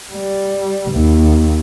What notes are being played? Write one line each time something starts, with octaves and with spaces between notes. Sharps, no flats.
G3
D#2